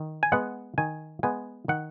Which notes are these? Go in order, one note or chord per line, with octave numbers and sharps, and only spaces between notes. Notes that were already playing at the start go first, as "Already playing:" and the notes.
Already playing: D#3
G#5
G#3 B3 F#5
D#3 G#5
G#3 B3 G#5
D#3 F#5